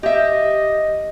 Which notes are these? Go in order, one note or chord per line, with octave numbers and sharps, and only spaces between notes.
G4 D#5 E5